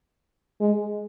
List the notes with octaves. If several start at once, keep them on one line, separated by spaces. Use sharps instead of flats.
G#3